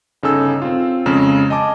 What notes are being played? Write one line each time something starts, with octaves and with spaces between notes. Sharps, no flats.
G1 C#3 D#4 A4 G#5 E6
C4 F4
F2 C#3 G#3 A#5 E7
D#5 G#5 A5 D6